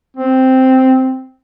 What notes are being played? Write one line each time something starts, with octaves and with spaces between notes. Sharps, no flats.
C4